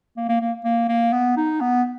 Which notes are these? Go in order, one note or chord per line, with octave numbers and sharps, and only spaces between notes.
A#3
A#3
A#3
A#3
A#3
B3
D#4
B3